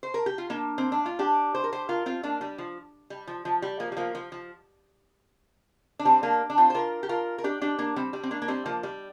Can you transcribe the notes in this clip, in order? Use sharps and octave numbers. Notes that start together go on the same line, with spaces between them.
C5
A#4
G4
F4
A#3 D4
C4
D4
F4
D4 G4
C5
A#4
G4 C5
F4 A#4
C4 F4
A#3 D4
G3
F3
G3
F3
F3
G3
F3 A#3
G3
F3 A#3
F3
F3
D4
G3 C4
A#3 D4
D4
C4 F4
C5
F4 A#4
G4
F4 A#4
A#4
D4 G4
D4 G4
A#3 D4
G3 C4
G3
C4
A#3 D4
A#3
G3 C4
F3 A#3
G3